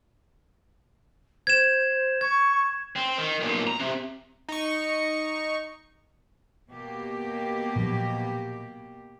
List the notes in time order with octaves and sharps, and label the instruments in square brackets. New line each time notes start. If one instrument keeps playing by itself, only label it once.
[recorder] C5 [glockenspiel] G#6 E7
[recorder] C#6 [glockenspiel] G#6
[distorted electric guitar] C4
D#3
B1 A#2
A#5
C3
[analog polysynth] D#4 C#6
[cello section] B2 A#3 G4
[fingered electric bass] A#2 F3 F#3